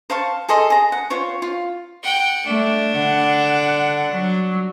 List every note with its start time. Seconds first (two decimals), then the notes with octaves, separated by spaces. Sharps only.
0.10 C5 F5 A5 C#6
0.49 G#4 A4 D#5 C6
0.70 G#4 A#5
0.92 F#5
1.10 F4 C5 C#5 C#6
1.42 F4
2.03 F#5 G5
2.46 A3 D4
2.98 D3 F#5
4.12 F#3